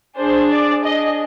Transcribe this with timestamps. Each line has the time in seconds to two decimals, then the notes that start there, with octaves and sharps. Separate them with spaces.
0.17 D4 G#4 C5
0.50 D5
0.83 D4 G#4 D#5